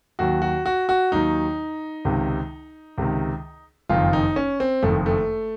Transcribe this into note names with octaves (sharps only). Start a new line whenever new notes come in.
D#2 D#3 F#3 F#4
F#4
F#4
F#4
D#2 D#3 F#3 D#4
C#2 C3 D#3
C#2 C3 D#3
F#1 F2 D#3 F4
D#4
C#4
C4
F#1 F2 D#3 A3
A3